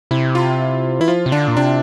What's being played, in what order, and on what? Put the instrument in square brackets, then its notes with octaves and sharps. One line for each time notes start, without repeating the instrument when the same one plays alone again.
[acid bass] C3 [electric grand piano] E4
[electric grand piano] F4
[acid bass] E3 [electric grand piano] E4
[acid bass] F3 [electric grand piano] F4
[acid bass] C3
[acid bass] D3 [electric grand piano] D4
[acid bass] A#2
[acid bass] C3 [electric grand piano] D4